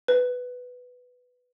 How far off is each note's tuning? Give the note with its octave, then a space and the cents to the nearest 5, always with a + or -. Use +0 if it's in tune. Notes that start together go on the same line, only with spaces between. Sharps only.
B4 +5